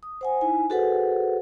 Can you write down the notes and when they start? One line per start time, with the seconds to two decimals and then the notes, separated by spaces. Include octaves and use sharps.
0.03 D#6
0.21 C5 F#5 G#5
0.41 D#4 E4 G#5
0.70 F#4 G#4 A4 B4 C5 F#5